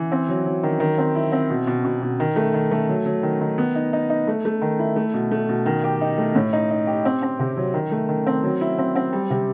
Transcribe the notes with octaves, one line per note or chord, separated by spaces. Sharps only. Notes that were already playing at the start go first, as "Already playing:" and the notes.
Already playing: E3
C4
F#3
F#3
D#3
D#3
C4
E4
C4
B2
B2
B2
B2
D#3
A3
D#3
A3
F#3
F#3
D#3
D#3
B3
D#4
D#4
D#4
A3
A3
D#3
E4
A3
B2
A3
B2
D#3
G4
D#4
A3
A2
D#4
D#4
G4
C4
C4
C3
F#3
D#3
A3
D#3
C4
F#3
E4
C4
C4
G3
C3